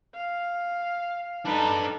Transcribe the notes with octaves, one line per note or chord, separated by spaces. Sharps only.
F5
D4 D#4 A4 B4